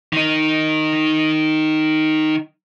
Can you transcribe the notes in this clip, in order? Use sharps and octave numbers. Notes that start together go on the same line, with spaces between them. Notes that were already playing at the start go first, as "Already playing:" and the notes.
D#3 D#4